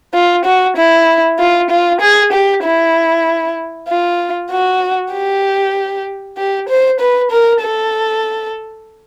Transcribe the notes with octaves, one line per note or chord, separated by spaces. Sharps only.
F4
F#4
E4
F4
F4
G#4
G4
E4
F4
F#4
G4
G4
C5
B4
A#4
A4